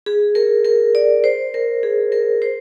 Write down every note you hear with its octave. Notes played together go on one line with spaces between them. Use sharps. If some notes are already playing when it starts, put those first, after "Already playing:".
G#4
A#4
A#4
D5
C5
A#4
G#4
A#4
C5